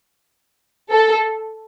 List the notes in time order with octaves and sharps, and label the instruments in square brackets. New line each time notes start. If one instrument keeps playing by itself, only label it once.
[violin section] A4